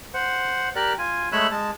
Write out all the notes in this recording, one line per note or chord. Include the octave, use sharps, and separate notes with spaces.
C5 F#5
G4 A#4 D5 F#6
F4 G#5
G#3 A3 C#5 B5 E6 F#6
G#3 A5